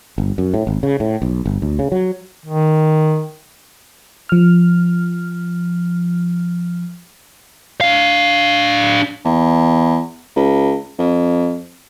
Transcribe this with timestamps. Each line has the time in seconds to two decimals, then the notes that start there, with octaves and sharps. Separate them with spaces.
0.18 G1
0.38 F#2
0.54 A2
0.67 G#1
0.83 C#3
1.00 A2
1.22 B1
1.46 G1
1.62 D2
1.79 C#3
1.92 F#3
2.45 D#3
4.29 F3 F6
7.81 D4 F5
9.25 E2
10.36 C#2
10.99 F2